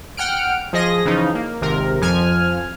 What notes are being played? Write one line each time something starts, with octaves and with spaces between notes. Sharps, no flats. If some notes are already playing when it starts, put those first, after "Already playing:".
F#5 G5 F6 D7
F3 G#4 D#5 A#6
C#3 E3 F3 D#4
A#3
G#1 C3 A#4
F2 F3 G#5 F6